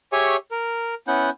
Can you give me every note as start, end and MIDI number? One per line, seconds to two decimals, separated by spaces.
0.13 0.36 67
0.13 0.36 68
0.13 0.36 73
0.13 0.36 76
0.13 0.36 80
0.13 0.36 85
0.51 0.95 70
1.08 1.30 59
1.08 1.30 61
1.08 1.30 64
1.08 1.30 78
1.08 1.30 91